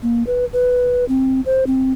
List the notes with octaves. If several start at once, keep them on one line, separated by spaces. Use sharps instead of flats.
A#3
B4
B4
C4
C5
C4